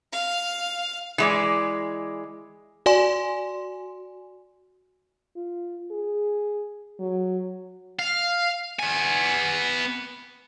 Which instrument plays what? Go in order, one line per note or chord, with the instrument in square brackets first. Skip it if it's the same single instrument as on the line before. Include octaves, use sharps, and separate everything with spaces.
[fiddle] F5
[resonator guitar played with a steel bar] E3 G#3 D5
[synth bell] F#4 D5 G#5 C6
[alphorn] F4
G#4
F#3
[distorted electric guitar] F5
B3 G#5